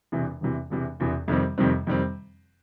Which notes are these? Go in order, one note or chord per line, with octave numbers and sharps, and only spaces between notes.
E1 E2 C3 E3
E1 E2 C3 E3
E1 E2 C3 E3
E1 E2 C3 E3
F2 C3 D#3 G3 C4
F2 C3 D#3 G3 C4
F2 C3 D#3 G3 C4